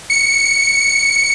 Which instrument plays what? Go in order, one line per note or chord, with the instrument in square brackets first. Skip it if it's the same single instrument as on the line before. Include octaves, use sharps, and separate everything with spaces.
[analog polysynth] C#7